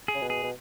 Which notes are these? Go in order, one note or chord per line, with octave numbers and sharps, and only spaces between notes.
G#4
C#3
B2
G#4
B2